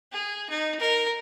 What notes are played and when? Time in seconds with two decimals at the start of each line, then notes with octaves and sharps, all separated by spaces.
0.13 G#4
0.50 D#4
0.80 A#4